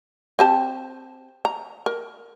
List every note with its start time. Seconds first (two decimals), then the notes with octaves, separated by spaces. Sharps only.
0.39 C4 G4 A5
1.45 A#5
1.86 A#4